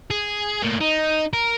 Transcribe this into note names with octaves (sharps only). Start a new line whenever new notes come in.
G#4
A2 A#3
D#4
A#4